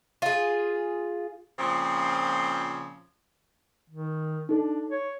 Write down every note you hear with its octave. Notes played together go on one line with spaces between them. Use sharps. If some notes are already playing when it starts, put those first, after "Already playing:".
F4 G#4
A#2 C#3 F3 C4
D#3
D4 D#4 A4
C#5